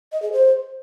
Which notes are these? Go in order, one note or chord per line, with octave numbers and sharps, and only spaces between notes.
D#5
G#4
C5